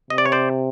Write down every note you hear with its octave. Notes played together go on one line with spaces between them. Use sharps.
C3 D#5
D5
C#5
C5 D5